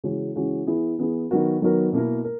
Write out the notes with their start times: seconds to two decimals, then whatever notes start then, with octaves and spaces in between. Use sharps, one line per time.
0.04 C#3 E3 G#3 C#4 F#4
0.35 C#3 E3 G#3 C#4 F#4
0.67 E3 B3 E4 G#4
0.99 E3 B3 E4 G#4
1.31 D#3 F#3 B3 F#4 A#4
1.62 D#3 F#3 B3 F#4 A#4
1.93 B2 A#3 E4 A#4
2.24 A#4